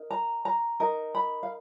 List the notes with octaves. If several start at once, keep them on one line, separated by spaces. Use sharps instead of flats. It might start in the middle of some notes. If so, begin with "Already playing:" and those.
Already playing: D#4 A#4
A#5
A#5
D#4 A#4
B5
F5